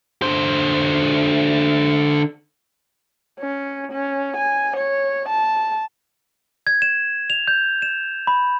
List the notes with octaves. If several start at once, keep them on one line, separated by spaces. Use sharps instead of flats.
D3 C5
C#4
C#4
G#5
C#5
A5
G#6
E7
F7
G6
E7
B5